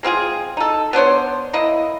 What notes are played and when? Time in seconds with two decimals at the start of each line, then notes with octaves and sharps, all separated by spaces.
0.03 G#3 C4 F4 G#4
0.57 D#4 A4
0.93 B3 D4 C5 C#5
1.53 A#3 E4 D#5